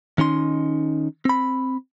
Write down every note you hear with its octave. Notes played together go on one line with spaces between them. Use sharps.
D#3 C#4 D#4 C6
C4 B5